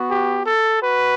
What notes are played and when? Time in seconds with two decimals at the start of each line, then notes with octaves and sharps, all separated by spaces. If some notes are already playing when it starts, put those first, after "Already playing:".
Already playing: B3 F#4
0.11 G4
0.46 A4
0.83 F#4 B4